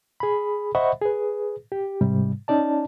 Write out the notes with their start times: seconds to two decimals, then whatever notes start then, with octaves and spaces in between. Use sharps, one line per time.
0.20 G#4 B5
0.75 C5 D#5 E5 F#5 B5 C#6
1.02 G#4 B4
1.72 G4
2.01 G#2 C3 G3
2.48 C#4 D#4 D5 A5